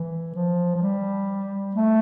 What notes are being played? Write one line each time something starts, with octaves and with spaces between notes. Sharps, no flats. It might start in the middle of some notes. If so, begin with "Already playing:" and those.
Already playing: E3
F3
F3
G3
A3